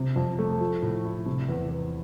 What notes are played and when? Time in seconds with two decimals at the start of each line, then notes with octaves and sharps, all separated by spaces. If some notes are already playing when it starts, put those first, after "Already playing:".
Already playing: C3
0.16 F2
0.39 A3
0.61 F3
0.82 A2
1.05 E4
1.26 C3
1.49 E2
1.70 E2